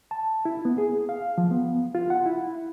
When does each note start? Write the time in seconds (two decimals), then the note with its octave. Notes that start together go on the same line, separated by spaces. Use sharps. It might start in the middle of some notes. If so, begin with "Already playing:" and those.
0.11 A5
0.45 E4
0.65 B3
0.78 G#4
1.09 F5
1.38 F3
1.51 B3
1.95 F4
2.10 F#5
2.26 E4